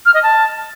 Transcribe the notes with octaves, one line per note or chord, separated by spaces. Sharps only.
F6
D#5
A5